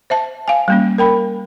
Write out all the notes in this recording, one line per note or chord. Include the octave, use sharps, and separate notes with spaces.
C5 E5 A5
F5 G#5
G3 A#3 C#4
A#4 G5 B5